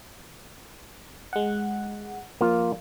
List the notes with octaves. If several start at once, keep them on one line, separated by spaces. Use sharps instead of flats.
G#3 F#5
F3 A#3 F4